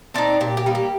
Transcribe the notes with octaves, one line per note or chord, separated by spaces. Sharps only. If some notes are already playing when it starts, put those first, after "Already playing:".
C4 D4 D#4 D5
A#2 G4
G4
G3 A#3 D#4
G4